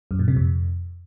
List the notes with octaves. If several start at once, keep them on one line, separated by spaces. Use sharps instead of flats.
F#2
A#2
C3
F2